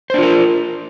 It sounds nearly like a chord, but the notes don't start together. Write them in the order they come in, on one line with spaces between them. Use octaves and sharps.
C5 D4 F4 A#4